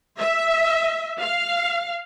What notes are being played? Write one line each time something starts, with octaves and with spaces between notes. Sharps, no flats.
E5
F5